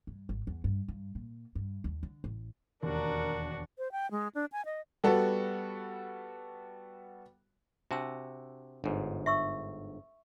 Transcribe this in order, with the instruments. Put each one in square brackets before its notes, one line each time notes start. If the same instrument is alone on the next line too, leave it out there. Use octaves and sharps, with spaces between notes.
[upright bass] G2
G#1
E2
G2
G2
A#2
G2
D#2
D3
A1
[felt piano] E1 D#2 [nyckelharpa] D4 F#4 [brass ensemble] A#4
[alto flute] C5
G5
G#3
D4
G#5
D#5
[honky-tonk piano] G3 B3 F#4 A4
[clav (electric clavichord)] C3 F#4 [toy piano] D4 A5 E6
[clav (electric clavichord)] G1 G#2
[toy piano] E5 C#6 E6